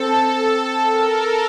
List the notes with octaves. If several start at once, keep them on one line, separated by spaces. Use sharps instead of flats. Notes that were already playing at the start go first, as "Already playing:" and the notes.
Already playing: C4 A4
A#4